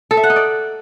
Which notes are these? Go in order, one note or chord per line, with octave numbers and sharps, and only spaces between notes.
A4
E5
F#5
D#4
D5